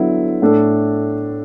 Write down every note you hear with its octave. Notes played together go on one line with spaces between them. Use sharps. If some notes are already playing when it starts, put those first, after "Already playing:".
Already playing: D3 F#3 B3 E4
A2 A3 D4 A4